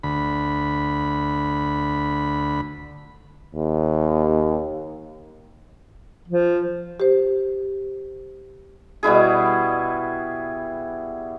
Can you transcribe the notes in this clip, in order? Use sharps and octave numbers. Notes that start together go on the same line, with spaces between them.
D2 B5
D#2
F3
G4 C5
B2 G3 E4 G#4